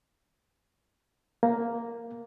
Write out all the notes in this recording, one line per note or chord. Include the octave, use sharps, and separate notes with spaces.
A#3